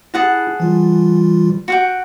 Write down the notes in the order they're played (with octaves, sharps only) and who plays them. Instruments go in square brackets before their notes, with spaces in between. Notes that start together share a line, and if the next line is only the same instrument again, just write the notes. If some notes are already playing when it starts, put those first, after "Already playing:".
[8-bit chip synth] E4 [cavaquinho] G#4 F#5 A5
[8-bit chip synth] E3 G3 F4
[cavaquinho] F#4 F#5 G5